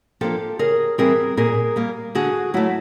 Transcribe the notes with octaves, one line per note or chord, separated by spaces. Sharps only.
F3 A#3 D4 G4 A4
C#3 G#4 A#4
E3 G3 C4 G#4 A#4
A#2 G#4 A#4
G3 A#3
D3 F#4 G#4
F#3 A3 E4 F#4